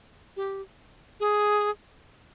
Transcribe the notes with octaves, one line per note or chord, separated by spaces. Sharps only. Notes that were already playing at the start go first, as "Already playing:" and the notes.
G4
G#4